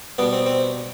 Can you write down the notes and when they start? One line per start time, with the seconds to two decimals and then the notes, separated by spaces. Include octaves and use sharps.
0.18 B2 G3 B3
0.33 C4
0.46 C4